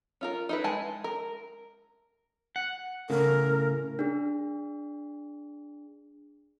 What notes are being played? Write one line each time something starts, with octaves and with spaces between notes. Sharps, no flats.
C#4 F4 A#4
D#4 E4 B4
G#3 G#5 A5
A#4
F#5
A2 C#3 A#4
D4 G#4